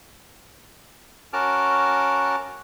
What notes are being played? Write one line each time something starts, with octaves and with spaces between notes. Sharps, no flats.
C#4 F#4 A#4 A5 D6 F6